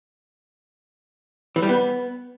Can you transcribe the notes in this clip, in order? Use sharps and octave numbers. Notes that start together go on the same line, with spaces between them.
E3
G3
B3